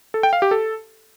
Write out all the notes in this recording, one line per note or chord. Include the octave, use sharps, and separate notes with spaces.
A4
G5
F5
G4
A4